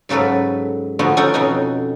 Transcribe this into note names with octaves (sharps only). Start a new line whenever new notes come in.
G#2 C#3 F#3 A4 B4
D3 F3 B3 D#4 F#4
C#4 D#4 A4 F#5 G5
F2 B2 C#4 D#4